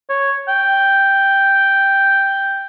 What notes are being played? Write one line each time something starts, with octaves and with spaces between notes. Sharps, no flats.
C#5
G5